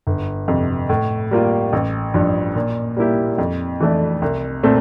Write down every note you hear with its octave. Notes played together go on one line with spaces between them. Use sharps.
G1
F2 C3
A2
G3 A#3 F4
A1
G2 F3
A#2
G3 A#3 E4 G4
F2
E3 A3 D4
C2
A#2 A3 C4